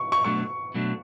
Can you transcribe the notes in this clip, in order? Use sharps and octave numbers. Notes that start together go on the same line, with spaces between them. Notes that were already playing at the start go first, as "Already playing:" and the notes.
Already playing: C#6
C#6
B2 F#3 A3 D4 C#6
B2 F#3 A3 D4